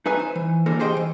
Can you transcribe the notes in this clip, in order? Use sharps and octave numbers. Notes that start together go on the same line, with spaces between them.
D#4 B4 G#5
C5
E3
D3 E3 A#3 A4 A#4 C5
G4 G#4 C5 D#5 E5 G5
E3